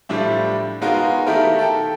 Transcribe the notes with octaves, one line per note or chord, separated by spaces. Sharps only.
A2 F3 G3 D4 E4
G#3 B3 D#4 F4 F#4 A#4
D#3 A3 E4 G4 A4 A#4
A4 G5